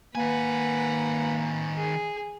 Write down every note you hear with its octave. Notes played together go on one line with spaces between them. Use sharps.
D#3 A#3 B4 F#5 G#5
G#4